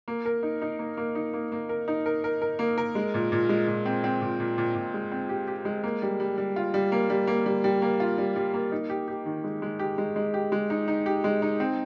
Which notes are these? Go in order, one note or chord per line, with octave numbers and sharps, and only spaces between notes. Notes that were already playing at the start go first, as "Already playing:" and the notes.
A#3
A#4
D#4
D#4
A#3
A#3
D#4
A#3
A#3
A#4
D#4
A#4
A#4
A#4
A#3
A#4
G#3
A#2
A#2
G#3
A#2
C4
C4
A#2
A#2
A#2
A#2
G#3
C4
G4
G4
G#3
A#3
G3
G3
G3
F4
G3
A#3
G3
A#3
G3
G3
A#3
F4
G3
G3
A#3
D#4
G4
G4
D#3
G#3
G#3
G4
G#3
G#3
G4
G#3
D#4
D#4
G4
G#3
D#4
C4